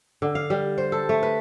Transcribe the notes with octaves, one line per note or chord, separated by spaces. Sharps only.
D3
F5
G3
C5
A4
A3
B4